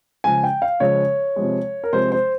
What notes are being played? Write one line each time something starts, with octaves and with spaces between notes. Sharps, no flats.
C#3 F3 G#3 G#5
G5
F5
C#3 F3 G#3 C#5
C3 F3 G#3
A#4
C3 F3 G#3 C5
C5